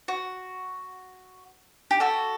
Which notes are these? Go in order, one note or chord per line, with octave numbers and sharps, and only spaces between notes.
F#4
G4
F#4 A4